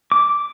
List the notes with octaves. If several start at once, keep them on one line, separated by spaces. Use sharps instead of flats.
D6